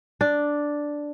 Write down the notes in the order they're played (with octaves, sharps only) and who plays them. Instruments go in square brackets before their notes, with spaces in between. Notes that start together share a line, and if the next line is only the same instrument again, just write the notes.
[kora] D4